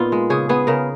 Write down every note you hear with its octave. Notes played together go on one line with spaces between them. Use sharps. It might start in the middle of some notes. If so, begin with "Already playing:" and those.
Already playing: A#2 B3 D#4 F4
G#3
C#3 G#4
B3 G#4
C#3 A#4